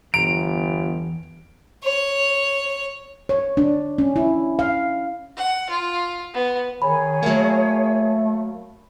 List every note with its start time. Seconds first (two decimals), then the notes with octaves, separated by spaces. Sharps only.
0.14 G1 E2 A#5 D7
1.84 C#5
3.29 C#5
3.57 D4
3.98 C#4
4.16 E4
4.59 F5
5.37 F#5
5.70 F4
6.34 B3
6.82 D#3 G#4 C#5 G#5 B5
7.23 F#3 A3 A#3